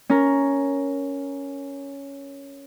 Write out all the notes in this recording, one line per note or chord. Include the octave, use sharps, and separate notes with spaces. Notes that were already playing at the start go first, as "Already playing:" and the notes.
C#4 A#4